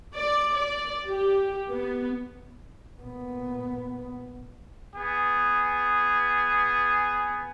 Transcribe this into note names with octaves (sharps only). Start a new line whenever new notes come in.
D5
D5
G4
B3
A#2 B3
B3 G#4